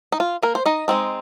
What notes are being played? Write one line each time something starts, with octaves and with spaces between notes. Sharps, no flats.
D#4
F4
A#3 A#4
C5
D#4 D#5
G#3 C4 D#4